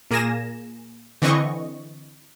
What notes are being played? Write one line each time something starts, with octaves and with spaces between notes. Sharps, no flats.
A#2 A#3 G#4 G#5 A#6 E7
D3 E3 C4 D#5 C#6